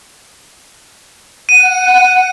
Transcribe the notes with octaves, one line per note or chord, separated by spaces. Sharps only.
F#5 D#7